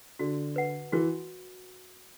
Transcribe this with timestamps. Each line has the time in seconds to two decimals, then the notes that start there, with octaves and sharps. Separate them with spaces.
0.19 D3 F#4
0.56 B4 F#5
0.92 E3 F#4